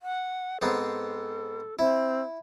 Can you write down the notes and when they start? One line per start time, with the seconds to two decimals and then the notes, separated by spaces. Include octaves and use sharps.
0.02 F#5
0.62 G#2 B3 C4 A4
1.79 C4 E4